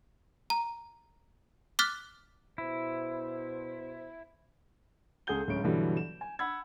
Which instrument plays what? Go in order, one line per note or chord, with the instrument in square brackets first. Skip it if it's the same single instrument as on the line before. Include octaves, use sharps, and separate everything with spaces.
[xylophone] A#5
D6 F6 F#6 A6 B6
[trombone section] B2 C5 [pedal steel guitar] E4
[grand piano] C#2 G#4 A4 F#5 G6 G7
D1 C#2 C#3 C#4 D7
G2 B2 D3 E3 F#3 G3
E7
G#5
F#5 B5 E6 G#6